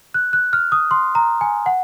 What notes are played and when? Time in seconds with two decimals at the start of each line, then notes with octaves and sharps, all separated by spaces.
0.14 F#6
0.33 F#6
0.53 F6
0.72 D#6
0.91 C6
1.15 A#5
1.41 G#5
1.66 F#5